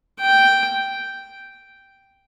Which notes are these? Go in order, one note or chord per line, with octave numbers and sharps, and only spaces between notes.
G5